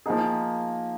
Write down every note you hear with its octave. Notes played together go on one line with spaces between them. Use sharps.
F3 A#3 D#4 G#4